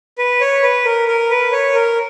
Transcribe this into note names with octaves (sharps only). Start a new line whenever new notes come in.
B4
C#5
B4
A#4
A#4
B4
C#5
A#4